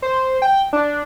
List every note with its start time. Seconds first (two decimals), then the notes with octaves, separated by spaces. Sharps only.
0.02 C5
0.42 G5
0.73 D4